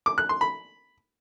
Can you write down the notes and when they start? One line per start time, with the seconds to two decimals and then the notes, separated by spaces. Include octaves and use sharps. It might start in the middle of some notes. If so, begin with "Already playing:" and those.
0.06 D6
0.18 F#6
0.29 C6
0.41 B5